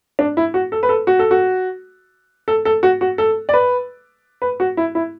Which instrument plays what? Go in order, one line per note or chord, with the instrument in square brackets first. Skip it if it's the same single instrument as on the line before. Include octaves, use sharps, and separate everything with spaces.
[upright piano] D4
E4
F#4
A4
B4
A4
F#4
A4
F#4
A4
A4
F#4
F#4
A4
D5
B4
B4
F#4
E4
E4